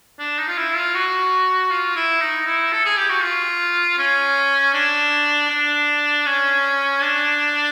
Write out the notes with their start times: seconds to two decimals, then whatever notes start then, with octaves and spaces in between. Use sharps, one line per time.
0.19 D4
0.39 D#4
0.48 F4
0.58 E4
0.76 F4
0.95 F#4
1.71 F4
1.96 E4
2.22 D#4
2.47 E4
2.73 A4
2.86 G#4
2.97 G4
3.10 F#4
3.23 F4
3.98 C#4
4.74 D4
5.50 D4
6.26 C#4
7.01 D4